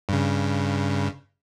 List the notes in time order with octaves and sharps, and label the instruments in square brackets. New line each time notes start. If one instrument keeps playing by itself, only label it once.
[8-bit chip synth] G2 C#3